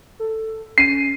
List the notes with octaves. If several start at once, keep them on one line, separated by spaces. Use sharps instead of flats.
A4
C#4 C7 D#7